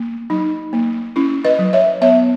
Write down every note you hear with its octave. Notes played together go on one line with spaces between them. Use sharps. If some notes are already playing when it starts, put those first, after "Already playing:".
Already playing: A#3
F#3 D#4
A#3
C#4 E4
B4 D#5
F#3
C#5 E5
B3 C#5 E5